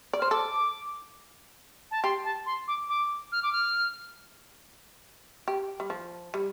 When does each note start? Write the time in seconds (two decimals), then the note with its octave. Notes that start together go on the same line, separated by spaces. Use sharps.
0.13 D5
0.19 C5 F6
0.31 A4 D6
1.91 A5
2.03 G4 C6
2.25 A5
2.46 C6
2.68 D6
2.89 D6
3.32 F6
3.43 D6
3.52 F6
5.48 G4
5.80 G3
5.90 F3
6.34 G3